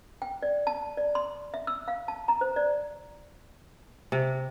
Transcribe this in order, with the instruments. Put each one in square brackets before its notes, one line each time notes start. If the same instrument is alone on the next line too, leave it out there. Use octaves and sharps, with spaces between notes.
[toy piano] G5
D5
A5
D5
C6
E5
E6
F5
A5
A#5
C5
D5
[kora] C3